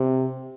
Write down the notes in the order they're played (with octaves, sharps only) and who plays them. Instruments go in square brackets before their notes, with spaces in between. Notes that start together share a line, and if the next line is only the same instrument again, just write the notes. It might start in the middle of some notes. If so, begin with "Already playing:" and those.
Already playing: [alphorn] C3